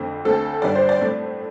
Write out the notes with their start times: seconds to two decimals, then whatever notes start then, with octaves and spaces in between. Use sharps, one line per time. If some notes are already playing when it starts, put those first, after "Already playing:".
Already playing: F2 D3 A3 C4
0.25 D2 D3 A3 C4 A4
0.62 G2 D3 G3 D4 D5
0.75 C5
0.89 D5
1.00 A2 A3 C4